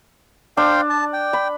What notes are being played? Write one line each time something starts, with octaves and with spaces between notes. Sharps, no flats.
D4 C5 F5 G5
A5
G5
B5